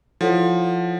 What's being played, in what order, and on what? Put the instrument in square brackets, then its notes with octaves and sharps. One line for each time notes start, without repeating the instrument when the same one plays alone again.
[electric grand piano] F3 [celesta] E4 A4 C#5 F#5